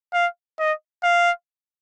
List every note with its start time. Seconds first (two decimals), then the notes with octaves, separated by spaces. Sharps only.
0.13 F5
0.59 D#5
1.04 F5